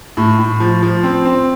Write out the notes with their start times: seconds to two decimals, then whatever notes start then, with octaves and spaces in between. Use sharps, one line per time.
0.17 A2
0.39 A2
0.60 F3
0.83 F3
1.03 C4
1.25 C4